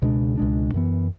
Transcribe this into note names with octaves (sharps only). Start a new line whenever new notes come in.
C#2 B2 G#3 D4
C#2 B2 G#3 D4
F#2 E3 B3